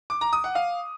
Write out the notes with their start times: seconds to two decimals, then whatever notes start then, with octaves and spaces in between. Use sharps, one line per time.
0.10 D6
0.21 A#5
0.33 D#6
0.44 F#5
0.55 F5